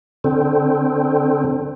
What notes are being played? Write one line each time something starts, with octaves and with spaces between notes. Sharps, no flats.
D3 C4